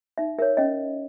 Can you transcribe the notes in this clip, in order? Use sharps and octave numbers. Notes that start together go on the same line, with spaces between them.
D#4 E5
A#4 C#5 E5
C#4 D#5